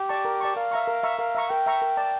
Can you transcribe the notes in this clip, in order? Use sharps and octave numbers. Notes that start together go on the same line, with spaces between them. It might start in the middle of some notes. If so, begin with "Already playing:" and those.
Already playing: G4
D5 A5 C#6
A#4
D5 A5 C#6
A#4 F5
E5 A#5 C#6
A#4
E5 A#5 C#6
A#4 F5
E5 A#5 C#6
A#4 G5
E5 A#5 C#6
A#4
D5 A5